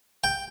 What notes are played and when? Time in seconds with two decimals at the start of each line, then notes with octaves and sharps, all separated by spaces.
0.24 G5